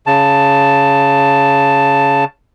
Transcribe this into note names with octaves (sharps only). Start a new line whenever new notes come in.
C#3 A5